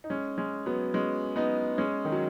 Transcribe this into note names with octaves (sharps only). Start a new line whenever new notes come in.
D#4
G#3 C#4
G#3 C#4
F#3 B3
G#3 C#4
B3 D#4
G#3 C#4
D#3
F#3